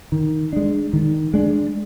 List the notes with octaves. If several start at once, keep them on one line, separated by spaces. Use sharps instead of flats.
D#3
G#3 D4
D#3
G#3 D4